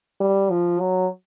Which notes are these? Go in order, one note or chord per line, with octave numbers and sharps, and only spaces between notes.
G3
F3
F#3